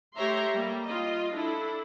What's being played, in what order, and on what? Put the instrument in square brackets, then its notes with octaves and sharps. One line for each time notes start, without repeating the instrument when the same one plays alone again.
[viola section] A3 G4 C#5 E5 A#5 C6
G3 A#3
F4 D#5
D4 E4 A4